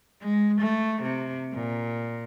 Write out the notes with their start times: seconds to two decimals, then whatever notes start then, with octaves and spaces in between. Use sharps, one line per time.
0.22 G#3
0.61 A3
1.02 C3
1.53 A#2